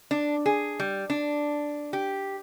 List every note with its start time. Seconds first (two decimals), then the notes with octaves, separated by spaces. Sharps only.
0.11 D4
0.46 G#4
0.80 G3
1.10 D4
1.93 G4